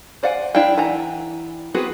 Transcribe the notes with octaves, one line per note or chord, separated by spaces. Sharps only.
C5 D5 F5 F#5 G#5
D4 E4 F5 G5
E3 F#5 A#5
B3 C4 F#4 G#4 B4